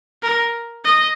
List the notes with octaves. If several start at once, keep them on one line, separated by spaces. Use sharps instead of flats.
A#4
D#5